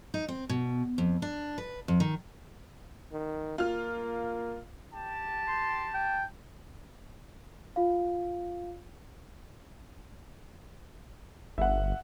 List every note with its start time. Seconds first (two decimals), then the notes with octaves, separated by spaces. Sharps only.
0.14 D#4
0.28 C4
0.49 B2
0.98 F2
1.22 D4
1.58 B4
1.88 F2
2.00 D#3
3.12 D#3
3.58 A#3 F4 F6
4.93 G4 A5
5.48 C6
5.94 G5
7.76 F4 F5
11.58 G1 E5 F#5